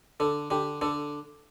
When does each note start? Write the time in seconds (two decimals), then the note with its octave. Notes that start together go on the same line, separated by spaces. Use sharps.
0.20 D3 A4
0.50 D3 G4
0.81 D3 A4